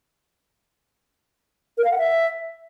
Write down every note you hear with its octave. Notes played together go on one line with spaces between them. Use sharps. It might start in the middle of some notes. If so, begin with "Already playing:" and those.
A#4
F5
F#5
E5